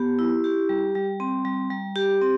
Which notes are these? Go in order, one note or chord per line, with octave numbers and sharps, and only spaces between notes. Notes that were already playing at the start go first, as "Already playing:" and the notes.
Already playing: B3 G4
E4
G4
G3
G3
C4
G3
G3
G4
C4